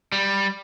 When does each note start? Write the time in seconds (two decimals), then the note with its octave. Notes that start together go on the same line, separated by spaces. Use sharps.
0.12 G3